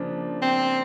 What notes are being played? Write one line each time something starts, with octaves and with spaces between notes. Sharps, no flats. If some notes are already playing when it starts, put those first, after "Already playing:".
Already playing: C#3 F3 A#3 D4
C4